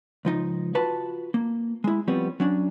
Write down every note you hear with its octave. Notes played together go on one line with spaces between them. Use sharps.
C#2 F3 D#4
F4 F#4 B4 A5
A#3
G#3 E4
F3 G3 B3 C4 C#5
F#3 C#4 D4